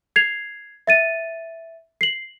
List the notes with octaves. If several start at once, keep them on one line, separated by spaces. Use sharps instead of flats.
G#6 C7 F7
E5 A6 D#7
C7 F#7